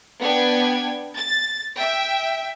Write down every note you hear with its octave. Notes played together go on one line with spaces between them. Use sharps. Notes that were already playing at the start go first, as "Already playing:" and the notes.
B3 D4 G5 G#6
A6
E5 G5